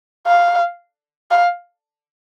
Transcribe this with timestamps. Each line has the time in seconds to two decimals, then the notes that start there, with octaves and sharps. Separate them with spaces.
0.27 F5
1.31 F5